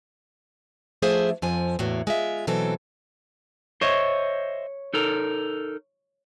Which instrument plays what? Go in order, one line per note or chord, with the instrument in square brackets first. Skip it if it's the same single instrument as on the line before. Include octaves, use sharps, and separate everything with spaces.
[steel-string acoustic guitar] F3 A3 D4 G#4 C5 E5
F2 F3 G#5
E2 A2 A#3 F#4
G#3 F4 E5
B2 E3 F#3 C4 A4
[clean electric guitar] C5 D#5 E5 [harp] C#5
[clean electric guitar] D#4 A4 A#4